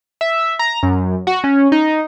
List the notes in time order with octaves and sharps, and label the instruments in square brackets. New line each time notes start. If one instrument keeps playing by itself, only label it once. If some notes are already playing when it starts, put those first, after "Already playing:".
[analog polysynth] E5
A#5
F#2
F#4
C#4
D#4